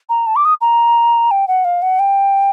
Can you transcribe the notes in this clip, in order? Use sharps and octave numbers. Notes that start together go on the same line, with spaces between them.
A#5
A5
D6
D#6
A#5
G5
F#5
F5
F#5
G5